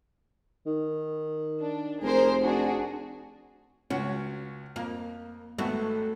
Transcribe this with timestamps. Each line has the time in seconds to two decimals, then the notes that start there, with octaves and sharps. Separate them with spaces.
0.66 D#3
1.62 D4
2.02 F1 G#4 A#4 C5
2.43 D4 F#4 G#4
3.90 C#2 C#4 F#4
4.76 F2 A#3
5.59 G#1 A3 B3 F#4